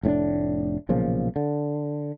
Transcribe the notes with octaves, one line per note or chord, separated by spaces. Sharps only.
F1 A2 C#4 D4
B1 A#2 C#3 F3
D3